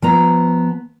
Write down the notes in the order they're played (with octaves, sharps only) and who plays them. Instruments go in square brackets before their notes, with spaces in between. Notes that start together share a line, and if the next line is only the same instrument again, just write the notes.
[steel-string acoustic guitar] F3 B3 A#5